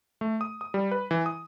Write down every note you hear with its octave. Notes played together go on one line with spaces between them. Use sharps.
A3
D#6
D#6
G3
B4
E3
D#6